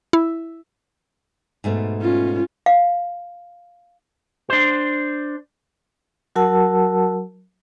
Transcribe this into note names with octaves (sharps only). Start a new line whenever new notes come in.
E4
G#2 B2 A3
C#4 F4
F5
D4 C5
F#3 F#4 A#4 F#5 A5 E6